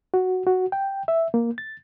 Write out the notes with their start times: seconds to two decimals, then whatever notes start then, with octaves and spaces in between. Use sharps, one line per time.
0.14 F#4
0.47 F#4
0.72 G5
1.08 E5
1.34 A#3
1.58 A6